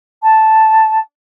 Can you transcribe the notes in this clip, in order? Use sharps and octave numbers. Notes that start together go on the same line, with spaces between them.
A5